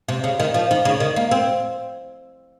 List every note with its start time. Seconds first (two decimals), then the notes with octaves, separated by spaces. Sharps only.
0.08 C3
0.24 C#3
0.40 D#3
0.54 F3
0.71 D#3
0.85 C#3
1.00 D#3
1.16 A#3
1.31 C4